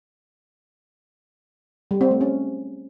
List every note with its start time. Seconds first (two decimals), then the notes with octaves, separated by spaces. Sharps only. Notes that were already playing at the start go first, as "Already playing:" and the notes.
1.91 G3
2.01 C4
2.11 A3
2.21 C#4